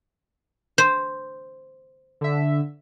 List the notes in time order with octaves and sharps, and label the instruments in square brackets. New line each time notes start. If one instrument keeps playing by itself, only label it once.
[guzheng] C5
[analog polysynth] D3 E5